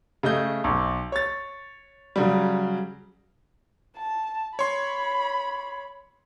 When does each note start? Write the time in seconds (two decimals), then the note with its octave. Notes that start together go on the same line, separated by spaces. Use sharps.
0.23 C#3 A3 D#5 G6
0.64 B1
1.12 C#5 A6
2.16 C#3 F#3 G3
3.96 A5
4.59 C#5 B5 C6